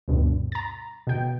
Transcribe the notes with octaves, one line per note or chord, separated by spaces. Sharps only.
D2 G2 B2
A#5 A6
B2 G5